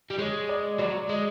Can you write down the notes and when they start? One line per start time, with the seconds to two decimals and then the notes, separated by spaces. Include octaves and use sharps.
0.10 G3
0.19 G#3 C#5
0.49 D5
0.79 F#3 D5
1.09 G#3